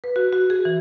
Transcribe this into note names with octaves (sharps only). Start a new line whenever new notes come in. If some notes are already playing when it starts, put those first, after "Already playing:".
B4
F#4
F#4
G#4
E3